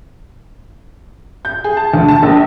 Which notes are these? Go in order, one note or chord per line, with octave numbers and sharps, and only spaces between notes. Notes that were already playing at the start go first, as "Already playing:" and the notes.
G6
G#4
A5
D2
A5
A#1